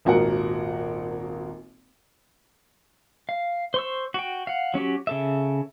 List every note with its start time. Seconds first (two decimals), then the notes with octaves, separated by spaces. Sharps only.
0.05 D#1 G#1 F#4 A#4 F#5
3.29 F5
3.74 C5 C#6 E6
4.14 F#4 G5
4.47 F5 F#5
4.74 F#3 C#4 F#4 G4
5.07 C#3 A4 E5